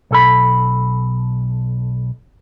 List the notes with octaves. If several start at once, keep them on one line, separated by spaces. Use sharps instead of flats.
B1 A4 B5